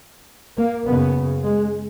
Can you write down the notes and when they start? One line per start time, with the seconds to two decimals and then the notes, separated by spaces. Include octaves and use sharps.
0.58 A#3
0.86 F#2 C#3 B3
1.44 G#3